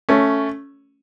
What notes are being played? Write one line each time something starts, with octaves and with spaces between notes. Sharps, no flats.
A3 C#4